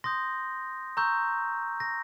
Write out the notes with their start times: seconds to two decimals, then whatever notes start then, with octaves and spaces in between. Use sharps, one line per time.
0.04 C6 D#6 G6 A#6
0.97 A#5 C#6 E6 G6
1.80 A#6